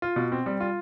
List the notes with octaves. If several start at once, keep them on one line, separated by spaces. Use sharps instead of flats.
F4
B2
C4
G3
F4